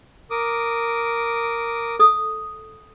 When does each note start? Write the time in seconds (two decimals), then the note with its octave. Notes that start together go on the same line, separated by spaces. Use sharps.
0.31 A#4 D6 D#6
1.99 A4 D#6